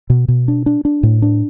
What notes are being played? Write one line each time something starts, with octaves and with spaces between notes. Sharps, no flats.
B2
B2
D4
D4
D4
A2
D4